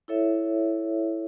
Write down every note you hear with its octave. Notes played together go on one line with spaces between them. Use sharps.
E4 A4 C#5 E5